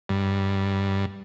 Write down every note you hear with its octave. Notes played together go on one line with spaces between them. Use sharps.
G2